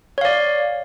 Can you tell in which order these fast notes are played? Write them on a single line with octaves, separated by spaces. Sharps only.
C#5 F5 D5